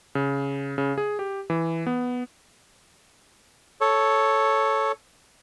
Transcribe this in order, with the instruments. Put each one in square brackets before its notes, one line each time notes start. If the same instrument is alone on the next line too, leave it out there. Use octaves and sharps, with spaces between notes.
[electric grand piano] C#3
C#3
G#4
G4
E3
B3
[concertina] A4 C#5